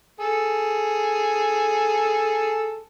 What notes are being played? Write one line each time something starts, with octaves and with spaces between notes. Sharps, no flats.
G#4 A4